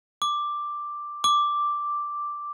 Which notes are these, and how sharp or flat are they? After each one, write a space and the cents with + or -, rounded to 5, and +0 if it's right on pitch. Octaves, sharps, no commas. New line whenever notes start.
D6 +5
D6 +0